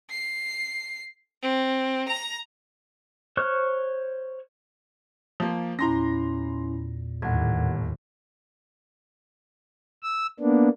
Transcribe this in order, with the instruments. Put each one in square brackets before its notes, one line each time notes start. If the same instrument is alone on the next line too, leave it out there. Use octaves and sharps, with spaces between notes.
[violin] C7
C4
A#5
[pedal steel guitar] C5 C#5 C#6 F6 F#6
[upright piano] F3 A#3
[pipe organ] E2 A#2 [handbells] C#4 E4 [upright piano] A#5 C6 A#6
[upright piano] G1 [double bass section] D#2 A2 [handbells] F#5 G#6
[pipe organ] E6
A#3 B3 D4